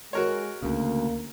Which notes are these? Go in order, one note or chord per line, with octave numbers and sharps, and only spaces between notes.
G#3 F#4 A#4 C#5
D2 C#3 A#3